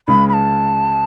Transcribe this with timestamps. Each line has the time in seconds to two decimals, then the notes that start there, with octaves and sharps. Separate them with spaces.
0.08 C#2 C#3 G#3 B5
0.29 B5
0.33 A5